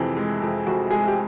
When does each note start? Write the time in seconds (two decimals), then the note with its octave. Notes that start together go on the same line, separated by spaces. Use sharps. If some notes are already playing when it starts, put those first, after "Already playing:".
Already playing: F2 C3 E3 G#3 G#4
0.17 G#3
0.42 F2
0.66 F2 F#4
0.91 G#3 G#4
1.07 G4